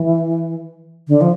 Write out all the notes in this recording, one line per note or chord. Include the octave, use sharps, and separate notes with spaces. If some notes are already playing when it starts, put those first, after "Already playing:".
Already playing: E3
D3
F3